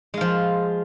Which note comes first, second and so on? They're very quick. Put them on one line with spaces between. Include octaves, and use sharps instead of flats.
G#3 F4 F3